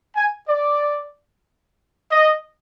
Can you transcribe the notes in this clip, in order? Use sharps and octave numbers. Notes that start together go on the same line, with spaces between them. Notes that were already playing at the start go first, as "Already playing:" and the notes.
G#5
D5
D#5